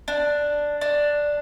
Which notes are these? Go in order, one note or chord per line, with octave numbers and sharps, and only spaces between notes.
D4
D4